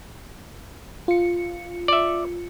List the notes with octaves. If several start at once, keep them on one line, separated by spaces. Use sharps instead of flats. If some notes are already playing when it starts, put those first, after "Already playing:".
F4 C#7
D5 E5